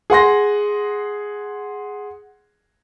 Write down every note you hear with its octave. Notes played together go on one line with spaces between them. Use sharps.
G#4 F#5 C6 A#6